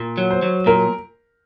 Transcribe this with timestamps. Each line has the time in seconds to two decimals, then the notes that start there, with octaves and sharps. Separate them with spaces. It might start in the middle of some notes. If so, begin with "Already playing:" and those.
Already playing: A#2
0.18 F#3
0.31 C5
0.42 F#3
0.66 A#2 A#4